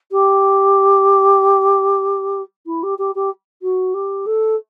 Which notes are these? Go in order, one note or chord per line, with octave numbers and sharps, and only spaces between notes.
G4
E4
G4
G4
G4
F#4
G4
A4